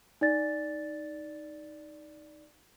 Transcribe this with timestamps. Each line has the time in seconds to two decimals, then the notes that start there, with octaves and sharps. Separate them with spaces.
0.21 D#4 D5 A6